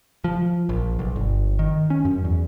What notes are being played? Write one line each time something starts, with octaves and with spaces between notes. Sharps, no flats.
F3
A#1
B1
G1
D#3
C#4
F#2
E2